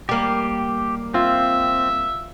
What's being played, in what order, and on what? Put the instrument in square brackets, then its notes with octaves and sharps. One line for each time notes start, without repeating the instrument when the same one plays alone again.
[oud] G3 A#3 [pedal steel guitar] G4
[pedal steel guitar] C4 [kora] F4 [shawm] E5